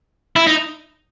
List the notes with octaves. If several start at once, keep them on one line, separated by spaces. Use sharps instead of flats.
E4
D#4